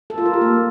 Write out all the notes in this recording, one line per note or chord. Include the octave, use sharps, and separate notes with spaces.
A4
F4
A#4
G4
A#3